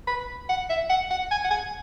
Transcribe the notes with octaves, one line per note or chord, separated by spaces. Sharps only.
B5
F#5
E5
F#5
F#5
G#5
F#5
G#5